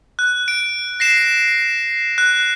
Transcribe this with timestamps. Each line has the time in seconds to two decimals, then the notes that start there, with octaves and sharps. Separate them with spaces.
0.19 F#6
0.48 D7
1.00 A#6 C7 E7
2.18 F#6